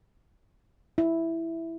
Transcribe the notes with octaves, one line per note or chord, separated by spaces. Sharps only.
E4